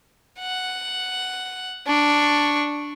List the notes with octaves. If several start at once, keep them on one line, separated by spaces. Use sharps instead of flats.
F#5
D4 C#6